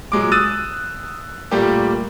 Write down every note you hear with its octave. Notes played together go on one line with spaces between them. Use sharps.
A#2 F#3 G#3 D6
D#6 E6 F#6 A6 D#7
A#2 G3 A3 A#3 G4